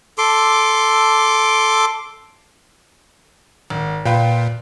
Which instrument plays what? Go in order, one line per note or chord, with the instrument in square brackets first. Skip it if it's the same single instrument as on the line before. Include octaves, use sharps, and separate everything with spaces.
[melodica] A4 C6 D6
[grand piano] G#1
[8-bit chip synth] A#2 [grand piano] B4 F5 G5